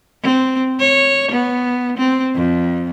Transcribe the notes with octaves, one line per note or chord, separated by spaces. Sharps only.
C4
C#5
B3
C4
F2